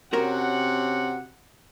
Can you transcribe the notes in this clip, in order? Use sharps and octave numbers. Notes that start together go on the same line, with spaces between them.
C3 C#4 F#4 A#4 C#5 F#5